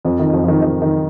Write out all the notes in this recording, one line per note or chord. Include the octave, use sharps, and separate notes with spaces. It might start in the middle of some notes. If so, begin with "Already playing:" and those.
F2 F3
D#3
F2 F3
F3
D#3
D#3
D#3